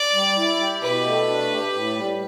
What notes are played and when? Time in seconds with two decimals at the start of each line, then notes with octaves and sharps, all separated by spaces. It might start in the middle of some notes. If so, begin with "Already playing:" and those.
Already playing: D5
0.14 G3
0.37 E4
0.60 G4
0.82 B2 B4
1.05 A3
1.28 D4
1.51 G4
1.74 A2
1.96 G3